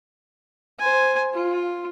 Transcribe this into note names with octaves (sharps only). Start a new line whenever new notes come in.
C5 G#5
F4